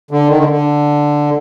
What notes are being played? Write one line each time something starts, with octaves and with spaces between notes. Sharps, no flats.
D3
D#3
D3
D3